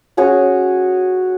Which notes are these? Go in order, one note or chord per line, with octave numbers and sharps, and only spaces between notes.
C#4 F#4 G#4 C#5